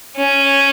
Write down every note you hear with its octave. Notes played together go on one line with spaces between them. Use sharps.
C#4